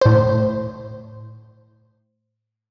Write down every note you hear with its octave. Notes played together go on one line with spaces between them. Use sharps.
A2 C5